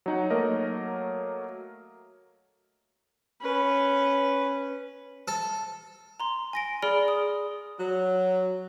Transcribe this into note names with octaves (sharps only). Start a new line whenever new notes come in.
F#3 D#4 F#5
F#3 A3 A#3 A#4 D#5
C#4 B4
A4
A#5 C6
G#5 A#6 D7
G#4 D5 B5 F6 D7 G7
D#6
F#3